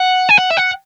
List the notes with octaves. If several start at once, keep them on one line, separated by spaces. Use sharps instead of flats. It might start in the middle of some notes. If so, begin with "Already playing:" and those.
Already playing: F#5
G#5
F#5
E5
F#5